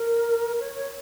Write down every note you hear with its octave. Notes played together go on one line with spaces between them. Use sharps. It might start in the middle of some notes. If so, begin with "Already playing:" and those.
Already playing: A#4
C#5
C#5